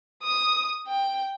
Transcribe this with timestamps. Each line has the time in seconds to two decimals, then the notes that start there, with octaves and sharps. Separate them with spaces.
0.22 D#6
0.88 G5